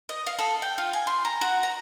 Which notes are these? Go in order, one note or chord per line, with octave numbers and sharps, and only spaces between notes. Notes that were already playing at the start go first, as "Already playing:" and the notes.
D#5
F5
A4
G5
F4
G#5
C6
A#5
F#4
A#5